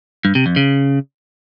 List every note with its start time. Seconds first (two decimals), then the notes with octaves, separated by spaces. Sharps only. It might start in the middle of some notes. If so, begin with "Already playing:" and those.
0.25 G2
0.35 C3
0.46 F2
0.56 C#3